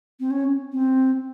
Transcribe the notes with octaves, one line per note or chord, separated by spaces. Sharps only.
C4
C#4
C4